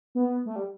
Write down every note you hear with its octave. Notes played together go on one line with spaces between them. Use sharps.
B3
A3
G3